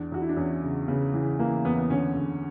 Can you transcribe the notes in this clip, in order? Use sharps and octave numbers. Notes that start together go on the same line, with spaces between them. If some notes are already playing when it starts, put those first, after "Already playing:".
Already playing: E2 D4
E2 F#4
E4
D4
E2 C#4
C#3
C#3 B3
E3
E3 A#3
E2 B3
B3
D3 C#4
D3